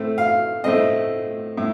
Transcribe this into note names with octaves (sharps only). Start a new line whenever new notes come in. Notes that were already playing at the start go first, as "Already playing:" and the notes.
Already playing: A2 A3 C4
F5
A2 A3 C4 D#5
A2